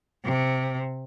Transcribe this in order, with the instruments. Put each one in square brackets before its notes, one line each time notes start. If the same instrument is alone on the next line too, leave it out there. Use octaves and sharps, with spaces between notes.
[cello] C3